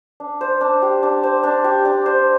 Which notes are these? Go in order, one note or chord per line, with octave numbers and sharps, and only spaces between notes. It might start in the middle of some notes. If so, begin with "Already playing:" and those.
D4
C5
D4
G4
D4
C5
D4
G4
D4
C5